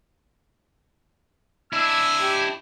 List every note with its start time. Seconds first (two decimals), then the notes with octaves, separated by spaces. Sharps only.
1.73 D4 E4 G#5 E6
2.21 G4